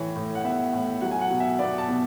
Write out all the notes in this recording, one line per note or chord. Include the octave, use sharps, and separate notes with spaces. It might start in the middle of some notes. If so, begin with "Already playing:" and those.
Already playing: A2 E3 C#5
A2
F#5
B3 E5
A2
F#3 F#5
G#5
F#5
B2
E5
B3 D5
A5
B2